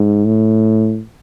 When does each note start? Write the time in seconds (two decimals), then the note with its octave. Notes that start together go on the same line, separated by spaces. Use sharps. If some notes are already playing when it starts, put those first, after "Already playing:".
Already playing: G#2
0.26 A2